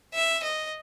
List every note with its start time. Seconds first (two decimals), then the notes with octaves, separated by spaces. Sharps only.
0.14 E5
0.43 D#5